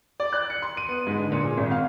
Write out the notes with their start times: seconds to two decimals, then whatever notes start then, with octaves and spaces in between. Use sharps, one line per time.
0.20 D5
0.33 F#6
0.50 C#7
0.62 C6
0.77 D#7
0.89 B3
1.07 G#2
1.19 D3
1.32 A#2
1.44 G#4
1.57 G#1
1.71 F5